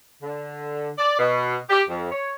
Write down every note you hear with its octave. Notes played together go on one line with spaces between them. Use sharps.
D3
D5
B2
G4
F2
C#5